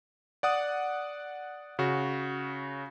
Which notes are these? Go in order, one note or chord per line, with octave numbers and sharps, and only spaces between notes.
D5 F#5 D#6
C#3 F#4